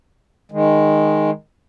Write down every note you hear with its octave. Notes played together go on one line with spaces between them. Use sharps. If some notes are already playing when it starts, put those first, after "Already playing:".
D#3 G#3